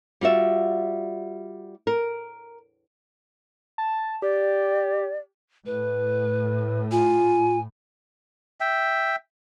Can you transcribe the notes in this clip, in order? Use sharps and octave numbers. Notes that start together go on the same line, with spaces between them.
G3 F4 F#4 E5
A#4
A5
G4 D5
A2 B4
F4 G#5
E5 G5